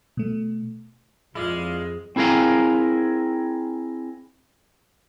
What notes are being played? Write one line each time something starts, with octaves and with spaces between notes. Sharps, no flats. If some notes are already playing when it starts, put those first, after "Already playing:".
B2 A3
F2 G#3 E4 F4 D5 F5
C4 E4 G#4 A#4 F5